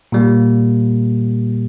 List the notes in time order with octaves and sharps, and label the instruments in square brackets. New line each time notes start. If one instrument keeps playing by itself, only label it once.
[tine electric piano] A#2 G3 A#3